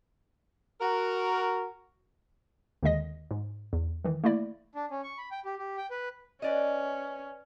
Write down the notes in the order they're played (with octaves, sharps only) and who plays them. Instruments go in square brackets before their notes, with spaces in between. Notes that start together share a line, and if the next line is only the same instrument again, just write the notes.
[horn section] F#4 A#4
[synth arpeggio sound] D#2 D3 D#3 G#3 D#5 A#6
G#2
E2
D#3 E3
A3 A#3 E4 D5
[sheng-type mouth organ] D4
C#4
C#6
B5
G5
G4
G4
G5
B4
[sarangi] C#4 [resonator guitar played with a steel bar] B4 D5 D#5